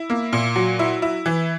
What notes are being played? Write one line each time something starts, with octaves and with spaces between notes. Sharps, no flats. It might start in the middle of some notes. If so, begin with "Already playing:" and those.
Already playing: E4
A#3
A#2
F#3
E4
E4
E3